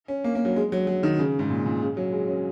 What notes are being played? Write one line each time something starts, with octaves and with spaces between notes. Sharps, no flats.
C#4
A#3
A#3
F#3
G#3
F#3
F#3
D#3
C#3
G#2
A#2
A#2
C#3
F#3
G#3
C#4